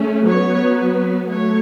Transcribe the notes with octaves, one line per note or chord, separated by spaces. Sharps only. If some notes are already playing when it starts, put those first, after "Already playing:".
Already playing: A3 C#4
F#3 B3 C#5
F#3 A3 C#5